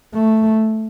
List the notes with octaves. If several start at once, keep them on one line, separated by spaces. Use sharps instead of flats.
A3